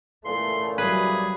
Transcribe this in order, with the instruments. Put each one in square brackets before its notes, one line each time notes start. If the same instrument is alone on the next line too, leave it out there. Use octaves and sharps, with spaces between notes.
[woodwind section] A#2 C#3 E3 [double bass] A3 [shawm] C6
[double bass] F#3 G3 [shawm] G#4 [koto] B4